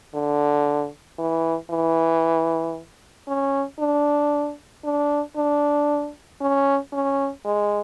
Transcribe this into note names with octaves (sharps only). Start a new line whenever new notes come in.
D3
E3
E3
C#4
D4
D4
D4
C#4
C#4
G#3